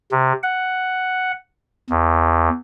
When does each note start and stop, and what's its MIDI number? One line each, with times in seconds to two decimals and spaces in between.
0.12 0.33 48
0.43 1.32 78
1.90 2.49 40